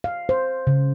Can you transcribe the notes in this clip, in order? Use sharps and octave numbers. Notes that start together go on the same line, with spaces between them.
F5
C5
C#3